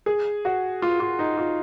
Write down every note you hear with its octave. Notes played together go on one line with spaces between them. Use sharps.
G#4
F#4
F4
F4
D#4
F4